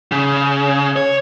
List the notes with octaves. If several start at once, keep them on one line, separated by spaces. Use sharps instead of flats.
C#3
C#5